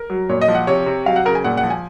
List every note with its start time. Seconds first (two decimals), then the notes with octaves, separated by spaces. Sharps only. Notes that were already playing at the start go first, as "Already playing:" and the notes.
Already playing: A#4
0.10 F#3
0.29 A#2 C#5
0.41 D#5
0.48 F3
0.55 F#5
0.67 C3 C#5
0.86 C3
1.06 F#3 F5
1.16 F#5
1.25 C#3 A#4
1.35 G#5
1.44 A#2 F#5
1.57 F#5
1.63 F3
1.70 G#5